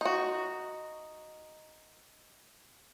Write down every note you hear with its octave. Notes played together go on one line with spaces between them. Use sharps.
D#4 F#4